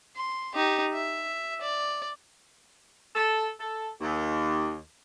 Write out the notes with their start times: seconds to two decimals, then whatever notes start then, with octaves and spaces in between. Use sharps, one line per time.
0.16 C6
0.55 D#4 G4
0.93 E5
1.61 D5
3.15 A4
3.59 A4
4.01 D#2